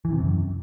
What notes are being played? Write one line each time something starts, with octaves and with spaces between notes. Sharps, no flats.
E3
C3
F#2